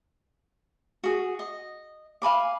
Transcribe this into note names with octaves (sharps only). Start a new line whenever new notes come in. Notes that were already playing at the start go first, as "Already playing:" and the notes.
F#4 G#4
D#5
F5 G#5 B5 D6